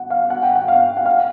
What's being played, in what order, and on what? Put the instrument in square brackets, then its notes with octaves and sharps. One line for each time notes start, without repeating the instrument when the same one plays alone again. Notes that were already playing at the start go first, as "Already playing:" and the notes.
Already playing: [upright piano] F#5
F5
F#5
G5
F#5
F5
F#5
F5